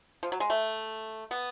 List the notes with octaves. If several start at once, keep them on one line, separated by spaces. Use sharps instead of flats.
F3
F#3
G#3
A3
B3